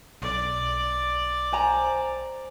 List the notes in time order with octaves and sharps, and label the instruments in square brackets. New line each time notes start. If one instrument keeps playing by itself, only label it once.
[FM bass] B1 [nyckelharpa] D5
[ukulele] C5 G#5 A#5